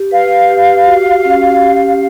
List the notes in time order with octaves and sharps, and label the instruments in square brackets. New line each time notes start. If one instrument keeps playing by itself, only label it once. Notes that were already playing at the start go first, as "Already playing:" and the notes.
Already playing: [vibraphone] G4
[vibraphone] B4 [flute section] F5
[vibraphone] G4
F#4
C#4
G4